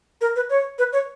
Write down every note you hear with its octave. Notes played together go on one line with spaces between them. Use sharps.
A#4
B4
C#5
B4
C#5